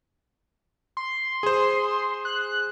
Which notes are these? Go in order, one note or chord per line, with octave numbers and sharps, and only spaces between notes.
C6
G#4 C5
F#6